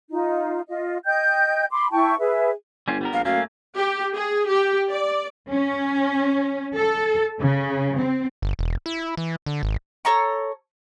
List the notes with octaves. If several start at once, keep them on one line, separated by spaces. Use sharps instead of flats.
D#4 F4
F4 D#5
D#5 G5 G6
B5 C6 D6
E4 G5 A5 C#6
G#4 B4 E5
G1 G3 C#4 F4
G3 B3 A#4
A#1 F5
F#2 A3 A#3 C#4 F5
G4
G#4
G4
D5
C#4
A4
C#3
C4
G1
E1
E4
E3
D3
G#1
A4 C#5 A#5 C#6